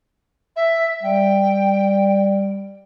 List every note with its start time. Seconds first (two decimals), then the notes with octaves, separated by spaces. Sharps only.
0.56 E5
1.03 G3 G5